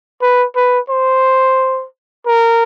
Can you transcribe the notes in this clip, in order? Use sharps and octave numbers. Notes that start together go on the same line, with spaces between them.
B4
B4
C5
A#4